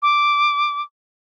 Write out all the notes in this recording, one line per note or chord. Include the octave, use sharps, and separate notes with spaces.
D6